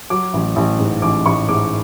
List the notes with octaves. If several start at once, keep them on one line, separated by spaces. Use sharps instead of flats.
F#3 D6
A1
A1
G#2
A1 D6
A1 C#6
G#2 D6